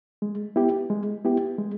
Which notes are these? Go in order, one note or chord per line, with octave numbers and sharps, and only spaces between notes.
G#3
B3 E4 G4
G#3
B3 E4 G4
G#3